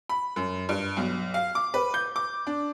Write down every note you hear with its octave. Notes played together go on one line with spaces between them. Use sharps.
B5
F#2
G2
B1
F5
D6
B4
G6
D6
D4